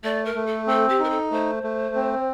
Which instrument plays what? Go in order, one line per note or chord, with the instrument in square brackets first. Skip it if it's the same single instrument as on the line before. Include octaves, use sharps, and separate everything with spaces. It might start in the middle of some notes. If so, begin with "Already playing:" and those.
[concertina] A3 [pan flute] D5
[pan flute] A#4
[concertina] A3
[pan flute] A4
[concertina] C4 [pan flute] A4
[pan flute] G4
[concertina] D#4 [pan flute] A#4
[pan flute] A4
[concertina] A3 [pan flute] C5
[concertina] A3
C4